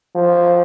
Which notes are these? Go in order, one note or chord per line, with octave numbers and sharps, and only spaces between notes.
F3